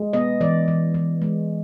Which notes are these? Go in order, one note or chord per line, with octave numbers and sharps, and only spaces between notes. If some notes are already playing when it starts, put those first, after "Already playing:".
Already playing: G#3
B3 D#5
E3 D5
E3
E3
G#3